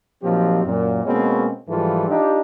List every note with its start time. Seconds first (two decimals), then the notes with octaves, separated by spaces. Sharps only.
0.23 A#2 F3 F#3 C4 D#4 G4
0.65 F#2 A#2
1.04 B2 G#3 A#3 C4 C#4
1.68 G#2 E3 F3 G3 F4 A4
2.08 D4 D#4 F4 G4